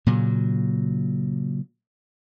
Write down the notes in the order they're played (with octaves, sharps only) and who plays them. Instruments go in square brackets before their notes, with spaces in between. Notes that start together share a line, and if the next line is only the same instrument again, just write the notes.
[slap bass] A#2 C#3 F#3